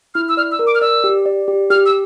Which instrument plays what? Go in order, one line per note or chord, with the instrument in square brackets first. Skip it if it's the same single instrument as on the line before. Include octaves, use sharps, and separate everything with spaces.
[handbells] E4 [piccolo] F6
[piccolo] E6
[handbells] D5 [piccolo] F6
[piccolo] E6
[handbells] A#4
[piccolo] D6
F6
[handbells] D5 [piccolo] E6
[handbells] G4
D5
G4
[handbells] G4 [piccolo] F6
[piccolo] E6